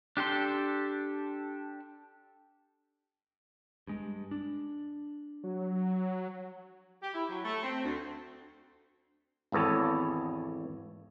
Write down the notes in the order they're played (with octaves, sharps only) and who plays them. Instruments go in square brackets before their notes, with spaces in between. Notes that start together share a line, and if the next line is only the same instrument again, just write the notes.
[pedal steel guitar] D4 G4 A4 C6
[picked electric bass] G2 G#3
D4
[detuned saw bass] F#3
[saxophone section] G4
E4
F#3
A3
C4
D2
[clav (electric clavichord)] G#1 E2 B3 A4 C#5